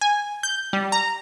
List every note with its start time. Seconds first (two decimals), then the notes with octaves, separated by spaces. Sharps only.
0.01 G#5
0.43 G6
0.73 G3
0.92 A#5